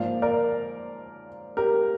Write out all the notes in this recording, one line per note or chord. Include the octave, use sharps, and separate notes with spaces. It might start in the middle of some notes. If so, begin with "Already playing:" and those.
Already playing: G#2 F3 A#3 D5 F5
A#4 D5
G4 A#4